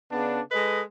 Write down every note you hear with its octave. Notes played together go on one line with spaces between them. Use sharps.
C#3 B3 D4
G#3 A4 B4 D#5